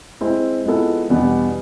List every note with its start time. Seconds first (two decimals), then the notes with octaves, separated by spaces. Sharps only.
0.21 G#3 C4 E4
0.66 F3 G#3 B3 E4 A4
1.10 E2 B2 G3 B3 D4